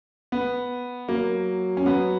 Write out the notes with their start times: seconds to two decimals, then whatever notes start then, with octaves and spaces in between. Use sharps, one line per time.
0.32 B3
1.08 F#3 A#3
1.77 C#4
1.85 F#3 B3